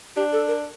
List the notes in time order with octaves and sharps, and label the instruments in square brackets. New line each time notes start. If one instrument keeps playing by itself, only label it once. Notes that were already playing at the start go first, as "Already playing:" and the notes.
[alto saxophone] D4 [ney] G4
[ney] A4
A#4